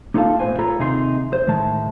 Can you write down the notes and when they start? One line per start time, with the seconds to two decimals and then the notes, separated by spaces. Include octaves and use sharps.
0.14 A#3 D#4 F4 A4 F5 A5
0.39 A2 B3 F#4 B4 C5 G#5
0.59 F4 G#4 A4 B4 C#5 A#5
0.79 D#2 C3 D#4 G#4 A#4 C6
1.33 C5
1.47 A2 D#3 G#3 A5